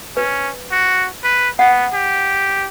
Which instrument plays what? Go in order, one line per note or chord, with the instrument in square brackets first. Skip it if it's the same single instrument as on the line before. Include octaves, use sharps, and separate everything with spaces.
[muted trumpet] C#4 [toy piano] B4
[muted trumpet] F#4
B4
[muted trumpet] B3 [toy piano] F#5
[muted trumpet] G4